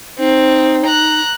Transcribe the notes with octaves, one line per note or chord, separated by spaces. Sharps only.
C4 D#4
A#5 F#6